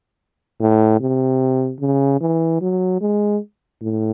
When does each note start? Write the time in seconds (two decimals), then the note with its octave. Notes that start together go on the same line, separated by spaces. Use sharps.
0.60 A2
1.00 C3
1.80 C#3
2.21 E3
2.61 F#3
3.01 G#3
3.82 A2